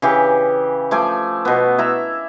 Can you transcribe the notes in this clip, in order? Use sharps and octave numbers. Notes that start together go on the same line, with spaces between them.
C#3 E3 G4
F3 A3 G#5 D6
B2 B3
E4 E5 A#5